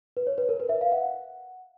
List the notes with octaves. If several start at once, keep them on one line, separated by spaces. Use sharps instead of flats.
B4
C#5
B4
A#4
B4
E5
F5
F#5